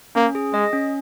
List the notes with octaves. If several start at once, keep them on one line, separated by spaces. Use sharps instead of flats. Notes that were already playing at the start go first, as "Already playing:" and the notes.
A#3 C#4
G#4
G#3 D#5
C#4